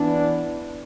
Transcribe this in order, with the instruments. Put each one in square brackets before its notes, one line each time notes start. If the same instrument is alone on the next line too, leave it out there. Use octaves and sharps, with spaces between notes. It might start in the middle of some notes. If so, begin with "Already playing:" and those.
Already playing: [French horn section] E3 B3 D4